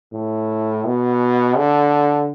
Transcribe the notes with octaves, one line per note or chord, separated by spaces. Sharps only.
A2
B2
D3